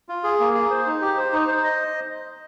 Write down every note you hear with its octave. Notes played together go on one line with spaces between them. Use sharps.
F4
G#4
A#3
G#4
C5
D#4
G4
C5
D#4
C5
D#5